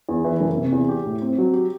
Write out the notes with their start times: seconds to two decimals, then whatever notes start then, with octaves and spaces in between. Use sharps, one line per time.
0.09 E2
0.24 E3
0.40 F#1
0.57 C3
0.72 E2
0.89 G4
1.06 A2
1.22 C4
1.38 F#3
1.53 G4